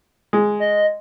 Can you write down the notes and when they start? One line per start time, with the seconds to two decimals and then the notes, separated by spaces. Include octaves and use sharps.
0.33 G#3
0.60 D#5